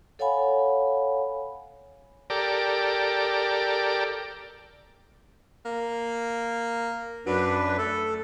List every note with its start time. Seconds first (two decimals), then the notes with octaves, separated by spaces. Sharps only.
0.19 A4 C#5 F5 F#5 G#5 B5
2.30 G4 A4 A#4 D5
5.65 A#3
7.27 F#2 F#3 D4 B4
7.78 A3 A4